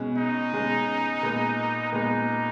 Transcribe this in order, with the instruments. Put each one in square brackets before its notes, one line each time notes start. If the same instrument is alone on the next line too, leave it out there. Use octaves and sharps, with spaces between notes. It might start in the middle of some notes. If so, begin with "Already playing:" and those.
Already playing: [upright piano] B2 G#3 C#4
[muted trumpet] D#4
[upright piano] B2 G#3 C#4
A#2 G#3 B3
[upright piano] A#2 G#3 B3 [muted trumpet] D#4